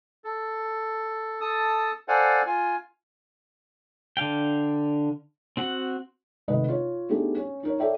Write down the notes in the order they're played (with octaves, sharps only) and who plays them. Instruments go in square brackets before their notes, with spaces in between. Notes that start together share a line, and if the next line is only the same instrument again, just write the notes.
[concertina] A4
A4 A5 D#6
A4 C5 D5 F5 F#5 G#5
F4 G#5
[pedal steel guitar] D3 D4 F5 G5
C4 F#4 F#5
[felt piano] G#1 C3 A3 B4 D#5
F4 C#5
A3 B3 D4 D#4 G4 G#4
C#4
D#4 A#4 C#5
A4 A#4 C#5 D5 E5 G5